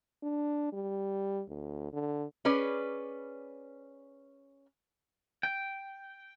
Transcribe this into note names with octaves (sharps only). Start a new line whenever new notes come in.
D4
G3
D2
D3
C#4 G#4 B4 D5
G5